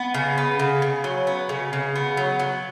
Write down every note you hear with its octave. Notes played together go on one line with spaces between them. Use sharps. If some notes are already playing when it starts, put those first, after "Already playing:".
Already playing: B3
C#3
B3
C#3
C#3
F#3
B3
C#3
C#3
B3
F#3
F#3